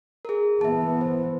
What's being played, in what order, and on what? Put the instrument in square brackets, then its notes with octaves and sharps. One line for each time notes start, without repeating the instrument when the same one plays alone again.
[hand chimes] G#4 A#4
[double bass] E3 B3 [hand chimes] E5 A5
[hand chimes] C5